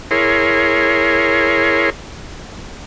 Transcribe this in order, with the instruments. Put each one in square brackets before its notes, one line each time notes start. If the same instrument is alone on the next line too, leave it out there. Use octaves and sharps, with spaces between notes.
[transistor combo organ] E4 G#4 A#4 C#5 C6